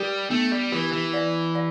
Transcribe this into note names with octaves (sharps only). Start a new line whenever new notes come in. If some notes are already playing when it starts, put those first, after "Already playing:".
Already playing: G3 G4
A3 B3
G3
E3 G4
E3
D5
D5